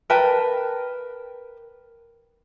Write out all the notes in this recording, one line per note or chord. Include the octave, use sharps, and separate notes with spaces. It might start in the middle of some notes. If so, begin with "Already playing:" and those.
A#4 B4 G5 A5